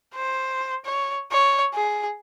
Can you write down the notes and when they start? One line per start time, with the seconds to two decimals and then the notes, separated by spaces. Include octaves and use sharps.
0.14 C5
0.85 C#5
1.31 C#5
1.74 G#4